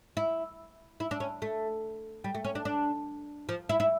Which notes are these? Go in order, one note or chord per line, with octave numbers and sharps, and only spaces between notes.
E4
E4
D4
C#4
A3
G3
A3
C#4
D4
D4
F3
E4
E4